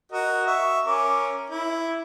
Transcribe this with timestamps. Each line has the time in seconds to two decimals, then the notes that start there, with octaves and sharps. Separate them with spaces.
0.12 F#4 A#4 D#5
0.47 E5 C#6
0.85 C#4 A#4 D6
1.50 E4